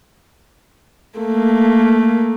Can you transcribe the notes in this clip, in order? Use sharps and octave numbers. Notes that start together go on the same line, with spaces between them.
A3 A#3